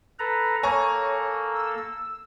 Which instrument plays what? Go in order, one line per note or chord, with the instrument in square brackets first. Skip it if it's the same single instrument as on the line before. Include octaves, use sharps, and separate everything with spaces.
[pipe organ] A4 B4 A#5
[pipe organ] A#3 A4 [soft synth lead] C#5 [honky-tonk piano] G#5 A#5 C#6
[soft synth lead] E6